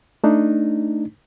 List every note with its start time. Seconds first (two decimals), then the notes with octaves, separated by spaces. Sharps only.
0.24 A3 D4 D#4